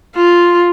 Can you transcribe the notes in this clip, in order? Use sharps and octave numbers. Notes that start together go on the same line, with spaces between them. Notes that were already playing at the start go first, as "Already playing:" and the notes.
F4